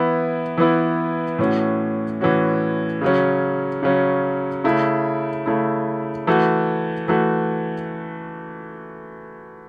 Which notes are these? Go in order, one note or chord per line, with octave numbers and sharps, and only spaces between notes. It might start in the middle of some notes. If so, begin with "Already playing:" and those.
Already playing: E3 B3 E4
E3 B3 E4
A2 E3 C#4 F#4
A2 E3 C#4 F#4
C#3 F#3 C#4
C#3 F#3 C#4
C#3 A3 E4
C#3 A3 E4
E3 A3 F#4
E3 A3 F#4